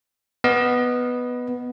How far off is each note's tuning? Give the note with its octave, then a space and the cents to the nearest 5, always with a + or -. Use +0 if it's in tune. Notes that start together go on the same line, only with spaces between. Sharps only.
B3 +0 D#5 +0